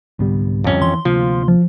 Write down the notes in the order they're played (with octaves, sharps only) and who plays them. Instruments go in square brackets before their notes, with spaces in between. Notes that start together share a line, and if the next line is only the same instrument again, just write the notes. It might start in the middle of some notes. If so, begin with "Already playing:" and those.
[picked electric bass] C2 G#2 B3 [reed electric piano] D3 G3
[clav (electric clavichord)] F2 C#4
[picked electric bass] E3 [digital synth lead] C6
[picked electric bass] D2 C3 A#3 [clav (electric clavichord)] F3 [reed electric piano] F4
[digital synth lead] F3